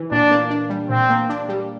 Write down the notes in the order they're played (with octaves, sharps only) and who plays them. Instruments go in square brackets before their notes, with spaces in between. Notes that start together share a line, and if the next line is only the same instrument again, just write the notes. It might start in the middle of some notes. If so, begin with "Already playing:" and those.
Already playing: [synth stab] E3
[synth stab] A#2 [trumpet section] D4
[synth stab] A#3
D4
G3
[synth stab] A#2 [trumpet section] C4
[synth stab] A#3
D4
G3